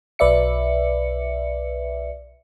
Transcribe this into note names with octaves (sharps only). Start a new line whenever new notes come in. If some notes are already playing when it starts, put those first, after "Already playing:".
B1 B4 D5 E5 C#7